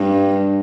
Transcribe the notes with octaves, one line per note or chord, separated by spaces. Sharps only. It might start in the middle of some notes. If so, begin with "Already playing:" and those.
Already playing: G2